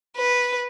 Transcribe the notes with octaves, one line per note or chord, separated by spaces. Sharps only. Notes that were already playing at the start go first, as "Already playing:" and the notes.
B4